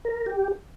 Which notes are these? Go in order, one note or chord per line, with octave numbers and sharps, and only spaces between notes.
A#4
G4